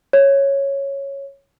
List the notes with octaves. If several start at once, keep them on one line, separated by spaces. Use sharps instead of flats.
C#5